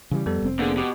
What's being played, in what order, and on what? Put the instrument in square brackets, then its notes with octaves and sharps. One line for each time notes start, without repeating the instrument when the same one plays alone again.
[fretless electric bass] C#3 E3 G3
[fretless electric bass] F2 [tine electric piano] G3 B3 A4
[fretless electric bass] F1 C4
[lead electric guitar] D3 [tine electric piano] A#3 B3 G#4
[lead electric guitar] B2 [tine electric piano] G4 D6